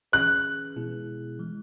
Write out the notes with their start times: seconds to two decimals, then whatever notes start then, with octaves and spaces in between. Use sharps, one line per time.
0.12 E3 C#4 G#4 B4 F#6
0.76 B2 G#3 B3 E4 G#4
1.39 E3 G#3